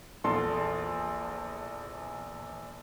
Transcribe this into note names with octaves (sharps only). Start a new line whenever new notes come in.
A#1 E2 A4 C6